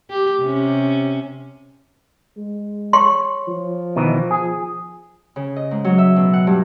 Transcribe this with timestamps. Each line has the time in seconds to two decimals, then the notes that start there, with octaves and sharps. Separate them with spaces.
0.10 G4
0.41 C3 C#4
2.37 G#3
2.93 C#5 C6
3.48 F3
3.96 B2 D#3 E3
4.31 G#4
5.36 C#3
5.56 D#5
5.71 G#2
5.84 F#3
5.98 E5
6.16 B2
6.33 F#5
6.47 G2